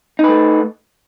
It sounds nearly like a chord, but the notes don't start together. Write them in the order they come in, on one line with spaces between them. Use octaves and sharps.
D#4 B4 A3